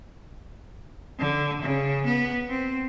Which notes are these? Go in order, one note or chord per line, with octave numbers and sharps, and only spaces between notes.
D3
C#3
B3
C4